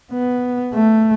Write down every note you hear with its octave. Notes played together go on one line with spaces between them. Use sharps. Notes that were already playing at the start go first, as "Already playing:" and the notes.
B3
A3